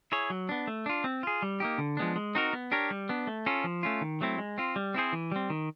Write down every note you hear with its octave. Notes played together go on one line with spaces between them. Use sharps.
E4 G#4 C#5
F#3
B3 D4
A3
D4 F4
C4
F4 G#4
G3
A#3 D#4 G4
D3
F3 G#3 B3 D4
G#3
C4 D#4 F#4 A#4
B3
D4 G4 A#4 C#5
G3
B3 D4
A3
C#4 F4 A4
F3
A3 C#4 F4
D#3
F#3 A3 C4 E4
G#3
C4 F4
G3
C4 E4 G#4 C5
E3
G3 C4
D#3